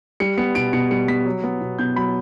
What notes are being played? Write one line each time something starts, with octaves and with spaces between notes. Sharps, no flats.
G3 C#7
B3 C#7
B2 D7
B2 C#7
G3 C#7
B3 B6
F#3
B3
B2
B2 G6
F#3 B5